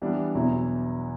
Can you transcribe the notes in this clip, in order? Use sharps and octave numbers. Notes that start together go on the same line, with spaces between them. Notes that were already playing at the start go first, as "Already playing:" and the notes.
E3 G3 B3 D4
E2 B2 F#3 B3 E4